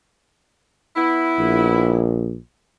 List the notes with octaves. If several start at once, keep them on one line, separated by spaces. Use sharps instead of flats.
B3 E4
A#1